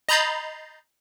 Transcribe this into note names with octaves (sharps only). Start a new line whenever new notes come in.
D#5 A#5 B5 G6 A6 C7